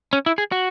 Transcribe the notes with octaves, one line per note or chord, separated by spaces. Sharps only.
C#4
E4
G#4
F#4